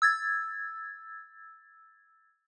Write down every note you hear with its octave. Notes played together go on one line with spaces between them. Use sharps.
E6 G#6 A6